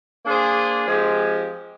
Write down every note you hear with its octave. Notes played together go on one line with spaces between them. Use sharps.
A#3 D4 G#4 C5
F3 G#3 C4 G4